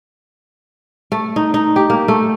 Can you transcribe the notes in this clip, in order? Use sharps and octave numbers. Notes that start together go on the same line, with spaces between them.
A3
D#4
D#4
G4
A#3
A3